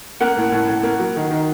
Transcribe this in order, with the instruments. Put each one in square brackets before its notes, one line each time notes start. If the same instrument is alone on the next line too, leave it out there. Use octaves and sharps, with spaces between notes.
[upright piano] A#3 F#5
A2
A2
A2
A#3
F#3
D#3
D#3